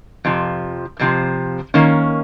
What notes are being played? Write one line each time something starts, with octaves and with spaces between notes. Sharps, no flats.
F2 C3 F3
F2 C3 F3
D#3 A#3 C#4